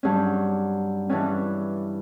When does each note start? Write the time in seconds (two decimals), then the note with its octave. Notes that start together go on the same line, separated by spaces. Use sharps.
0.03 G2 F#3 C#4
1.09 G2 E3 G3 C#4